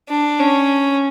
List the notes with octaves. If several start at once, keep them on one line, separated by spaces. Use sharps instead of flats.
D4
C#4